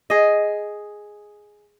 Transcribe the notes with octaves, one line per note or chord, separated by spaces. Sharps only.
G#4 D#5